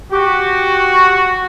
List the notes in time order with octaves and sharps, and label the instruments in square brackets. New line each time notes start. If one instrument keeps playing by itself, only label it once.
[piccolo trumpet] F#4 [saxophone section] G4